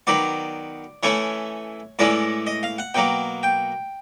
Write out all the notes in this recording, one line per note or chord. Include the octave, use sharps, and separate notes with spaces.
D#3 F#3 B3 D5
E3 A3 C#4 E4 C#5
A2 E3 G#3 C#4 E4 D5
D#5
F5
F#5
B2 F#3 A#3 G5
G5